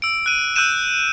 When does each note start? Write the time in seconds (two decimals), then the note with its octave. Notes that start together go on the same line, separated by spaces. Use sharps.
0.02 E6 D7
0.26 F#6 D#7
0.56 E6 F#6 G6 D#7 E7